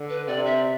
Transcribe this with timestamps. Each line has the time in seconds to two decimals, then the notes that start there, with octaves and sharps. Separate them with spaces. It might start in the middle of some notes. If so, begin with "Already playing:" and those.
Already playing: D3
0.09 B4
0.28 C3 D5
0.46 E5